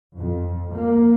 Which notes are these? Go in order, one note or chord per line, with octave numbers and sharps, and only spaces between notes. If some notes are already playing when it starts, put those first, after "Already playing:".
F2
A#3